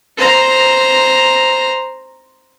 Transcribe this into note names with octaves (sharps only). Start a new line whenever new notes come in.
C5 A#5